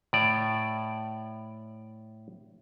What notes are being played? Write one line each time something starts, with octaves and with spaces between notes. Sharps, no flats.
A2 D5